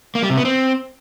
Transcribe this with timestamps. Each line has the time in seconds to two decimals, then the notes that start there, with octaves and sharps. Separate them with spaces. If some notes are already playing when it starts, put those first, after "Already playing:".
0.15 A#3
0.23 G3
0.30 C3
0.37 B3
0.45 C4